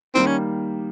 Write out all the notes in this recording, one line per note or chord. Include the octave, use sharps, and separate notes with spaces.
D#3 G3 A#3 C4
C#4